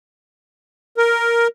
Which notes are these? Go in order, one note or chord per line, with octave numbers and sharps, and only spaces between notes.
A#4